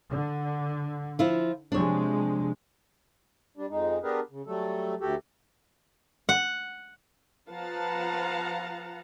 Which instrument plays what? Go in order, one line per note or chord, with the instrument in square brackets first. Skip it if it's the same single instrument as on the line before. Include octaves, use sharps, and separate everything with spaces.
[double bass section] D3
[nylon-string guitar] F3 E4 F4
[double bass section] C3 F3 G#3 [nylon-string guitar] D4 C#5
[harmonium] G3 D4
F2 G#3 D#4
B3 D4 G4 G#4 A#4 B4
C#3
F#3 G3 A3 A4
D2 F#4 G4 A4
[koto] F#5
[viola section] F3 B4 F5 F#5 A5 A#5